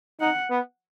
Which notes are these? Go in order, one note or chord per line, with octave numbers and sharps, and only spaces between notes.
D#4 F#5
B3